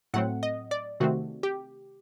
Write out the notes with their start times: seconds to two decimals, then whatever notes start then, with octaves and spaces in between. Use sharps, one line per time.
0.14 A2 F#3 A3 C4 F#5
0.43 D#5
0.71 D5
1.00 C3 D#3 A3 C4 F#4
1.43 G4